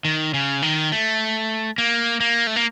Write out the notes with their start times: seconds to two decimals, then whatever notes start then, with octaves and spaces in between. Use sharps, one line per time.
0.05 D#3
0.34 C#3
0.62 D#3
0.92 A3
1.78 A#3
2.20 A#3
2.47 A3
2.56 A#3